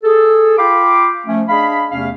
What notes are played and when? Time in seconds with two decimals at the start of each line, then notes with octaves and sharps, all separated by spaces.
0.04 G#4 A4
0.58 F4 F5 G5 B5 D6
1.26 F3 A3 C#4
1.49 D4 G#4 D#5 F5 B5
1.92 E2 C3 A3 C#4 F5